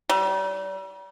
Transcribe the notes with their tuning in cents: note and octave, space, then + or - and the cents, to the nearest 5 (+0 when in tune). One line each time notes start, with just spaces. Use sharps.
G3 -40